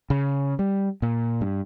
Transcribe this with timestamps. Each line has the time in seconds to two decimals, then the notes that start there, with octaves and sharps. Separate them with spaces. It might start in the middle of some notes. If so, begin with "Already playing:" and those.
0.10 C#3
0.59 G3
1.02 A#2
1.41 G2